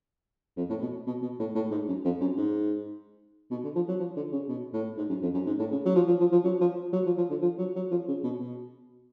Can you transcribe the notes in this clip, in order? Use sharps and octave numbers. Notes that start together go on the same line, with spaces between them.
F2
A2
B2
B2
B2
A2
A2
G#2
F#2
F2
F#2
G#2
B2
D3
F3
F#3
F3
D3
C#3
B2
A2
G#2
F#2
F2
F#2
G#2
A2
C#3
F#3
F3
F3
F3
F3
F#3
F3
F#3
F3
F3
D3
F3
F#3
F#3
F3
C#3
B2
B2